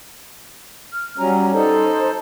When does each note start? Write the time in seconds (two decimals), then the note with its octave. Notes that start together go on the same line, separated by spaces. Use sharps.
0.93 F6
1.18 F#3 G3 C#4 A#5
1.53 D#4 A4 C5